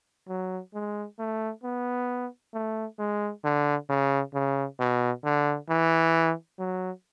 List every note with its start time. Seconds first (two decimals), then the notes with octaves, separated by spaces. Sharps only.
0.28 F#3
0.74 G#3
1.19 A3
1.64 B3
2.54 A3
2.99 G#3
3.44 D3
3.89 C#3
4.34 C#3
4.80 B2
5.25 D3
5.69 E3
6.59 F#3